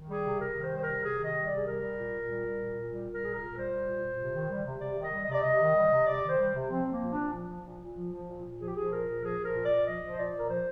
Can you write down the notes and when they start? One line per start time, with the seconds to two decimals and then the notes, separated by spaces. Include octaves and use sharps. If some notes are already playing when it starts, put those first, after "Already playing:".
Already playing: D#3
0.09 G3 G#4
0.25 C3
0.40 C3 A#4
0.56 D#3 C5
0.71 G3
0.76 C5
0.82 C3 A#4
1.03 C3 G#4
1.18 D#3
1.25 D#5
1.34 G3
1.46 C3 D5
1.56 G#4
1.66 G3 A#4
1.81 G3
1.98 A#2
2.14 A#2
2.29 G3
2.45 G3
2.61 A#2
2.76 A#2
2.92 G3
3.08 G3
3.13 A#4
3.24 A#2 G#4
3.35 A#4
3.40 A#2
3.55 G3 C5
3.71 G3
3.87 A#2
4.02 A#2
4.18 C3
4.34 D#3
4.50 G3
4.65 C3
4.81 C3 D5
4.98 D#3 D#5
5.12 G3
5.23 D#5
5.29 C3 D5
5.41 C3 D#5
5.60 D#3
5.75 G3
5.92 C3
6.07 C3 D5
6.23 D#3
6.29 C5
6.39 G3
6.55 C3
6.70 F3 C4
6.86 F3
6.91 A#3
7.02 A#2
7.12 D4
7.18 A#2
7.33 F3
7.49 F3
7.65 A#2
7.81 A#2
7.96 F3
8.13 F3
8.28 A#2
8.44 A#2
8.59 F3 G#4
8.67 G4
8.75 F3 G#4
8.91 A#2 A#4
9.06 A#2
9.22 F3 G#4
9.39 F3 A#4
9.54 A#2
9.65 D5
9.70 A#2
9.85 F3 D#5
10.01 F3
10.10 C5
10.16 A#2 D5
10.33 A#2 A#4
10.48 F3 C5